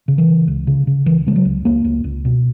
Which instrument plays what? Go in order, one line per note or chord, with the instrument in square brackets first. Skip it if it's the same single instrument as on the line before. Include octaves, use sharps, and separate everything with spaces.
[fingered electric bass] C#3
E3
C#3
C#2
C#3
C#3
C#2 E3
C#3 G#3
F#3
C#2
C#2 A#3
C#2
C#2
B2